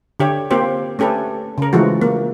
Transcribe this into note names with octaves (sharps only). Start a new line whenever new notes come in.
D3 G4 C#5
A#3 C4 F4 G4 C5
A3 C#4 G4 A4 B4
C#3 A#4
E3 F3 G#3 A3 F#4
A#3